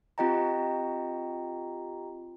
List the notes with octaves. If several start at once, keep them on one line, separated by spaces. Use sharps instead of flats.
C4 F4 G4 D#5 G5 A#5